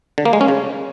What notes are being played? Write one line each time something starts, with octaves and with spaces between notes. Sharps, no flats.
D3
A#3
G#3
C#4
C#3